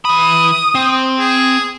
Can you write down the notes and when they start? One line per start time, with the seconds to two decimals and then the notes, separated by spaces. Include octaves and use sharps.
0.05 E3 B5 D#6
0.75 C4
1.19 G#4